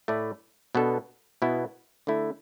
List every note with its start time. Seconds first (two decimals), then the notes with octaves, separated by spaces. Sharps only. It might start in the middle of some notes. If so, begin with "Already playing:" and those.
0.08 A2 A3 E4 D5
0.75 B2 B3 D4 A4
1.42 B2 B3 E4
2.07 D3 A3 E4